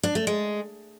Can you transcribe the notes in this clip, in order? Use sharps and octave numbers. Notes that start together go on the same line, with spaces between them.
D4
A3
G#3